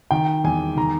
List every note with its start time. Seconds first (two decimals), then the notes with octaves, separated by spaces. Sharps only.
0.11 D#3 G5
0.44 E2 G#5
0.77 D#3 A#5